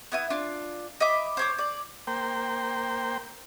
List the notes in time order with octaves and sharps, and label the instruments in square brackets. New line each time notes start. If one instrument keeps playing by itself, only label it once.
[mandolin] B3 E4 D#6
D4 F4
D#5 E5 B5 D6
C5 C#5 D6
D5
[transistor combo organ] A#3 C5 G5